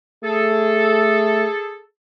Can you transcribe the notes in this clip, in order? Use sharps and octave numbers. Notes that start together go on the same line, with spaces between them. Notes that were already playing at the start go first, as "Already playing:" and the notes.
A3 G#4 A4